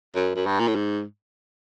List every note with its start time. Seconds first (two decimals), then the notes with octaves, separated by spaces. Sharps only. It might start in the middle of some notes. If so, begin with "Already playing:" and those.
0.15 F#2
0.36 F#2
0.46 G2
0.59 A#2
0.68 A2
0.75 G#2